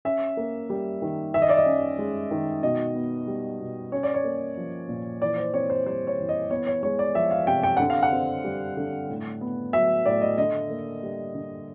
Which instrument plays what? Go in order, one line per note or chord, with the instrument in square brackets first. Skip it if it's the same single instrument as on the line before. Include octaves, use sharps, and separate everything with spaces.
[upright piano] C#4 E5
A#3
G3
D#3
D#3 E5
D#5
D5
D#5
C#4
G#3
D#3
B2 D#5
B3
G3
B2
C#4 C#5
D5
C#5
A#3
F3
A#2
E3 D5
C5
C4 C#5
C5
G3 C5
C#5
E3
D#5
B3 C#5
C#5
G#3 C#5
D5
F3 E5
F5
C3 G5
G5
D3 F#5
F5
F#5
C4
G3
D3
A2
B3
F#3 E5
A2 D5
D#5
D3 D#5
A#3
G3
D3